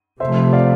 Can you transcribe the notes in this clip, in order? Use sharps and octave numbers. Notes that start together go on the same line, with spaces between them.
C3 F3 A3 C5 E5
D5 F5